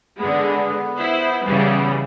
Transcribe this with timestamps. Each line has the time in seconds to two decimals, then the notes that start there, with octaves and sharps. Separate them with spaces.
0.19 D3 G#3 B3
0.97 E4 C5
1.45 C#3 E3 G3